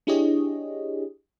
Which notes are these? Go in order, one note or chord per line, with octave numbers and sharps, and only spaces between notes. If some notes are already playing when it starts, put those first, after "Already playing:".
D4 E4 G4 G#4 C#5 D#5